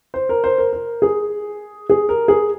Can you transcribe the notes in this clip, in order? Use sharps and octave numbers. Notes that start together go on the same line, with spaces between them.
C5
A#4
C5
A#4
A#4
G#4
G#4
A#4
G#4